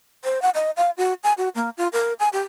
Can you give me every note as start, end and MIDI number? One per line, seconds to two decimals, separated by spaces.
0.24 0.41 72
0.42 0.50 78
0.55 0.71 75
0.77 0.91 77
0.97 1.14 66
1.24 1.33 80
1.38 1.49 66
1.55 1.70 58
1.78 1.88 65
1.93 2.13 70
2.19 2.29 80
2.33 2.41 67